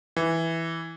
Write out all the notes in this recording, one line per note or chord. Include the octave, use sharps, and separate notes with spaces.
E3